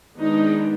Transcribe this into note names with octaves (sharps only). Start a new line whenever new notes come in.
D#3 G#3 B3 D4 D#4